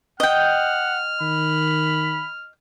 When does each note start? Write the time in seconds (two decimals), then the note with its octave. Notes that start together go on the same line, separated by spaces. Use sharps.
0.20 D#5 F#5 G5 F6
1.21 D#3 B5